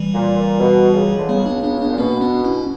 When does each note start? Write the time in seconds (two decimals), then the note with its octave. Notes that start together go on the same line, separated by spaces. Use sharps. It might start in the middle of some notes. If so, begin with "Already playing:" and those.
Already playing: E3 G3
0.14 A#2
0.37 A#2
0.60 B2
0.94 C#2 C#3
1.18 D3
1.28 C#2 C#3 G3 B3
1.46 B3 D4
1.63 B3 D4
1.81 B3 D4
1.90 A#2
1.98 B2 A#3 C#4
2.21 B3 D4
2.44 C#4 E4